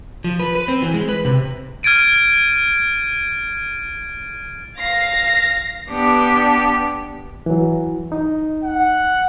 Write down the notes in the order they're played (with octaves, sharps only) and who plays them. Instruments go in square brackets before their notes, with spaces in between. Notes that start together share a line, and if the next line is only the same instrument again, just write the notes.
[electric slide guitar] F3
B4
B4
C4
E3
G#3
B4
C3
[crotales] F6 G#6 A6 D7 D#7
[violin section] F5 A#6 C7
[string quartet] B3 D4 G4
[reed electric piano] E3 F#3
D#4
[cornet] F#5